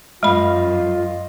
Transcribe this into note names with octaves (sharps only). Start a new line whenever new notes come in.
F#2 G#3 F4 D#5 F5 B5